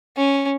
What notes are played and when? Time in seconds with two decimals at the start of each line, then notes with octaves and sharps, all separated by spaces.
0.17 C#4